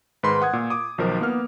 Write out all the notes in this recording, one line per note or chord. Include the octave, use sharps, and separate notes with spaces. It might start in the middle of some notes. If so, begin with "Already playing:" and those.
G#2 D#3 B4 B5 C6
F#5 D#6 G#6
A#2
D6 D#6
B1 D#3 F3 A#4
A#3 B3 F6